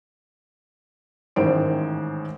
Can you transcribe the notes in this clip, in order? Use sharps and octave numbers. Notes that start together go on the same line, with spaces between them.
A1 G#2 D#3 C5 D7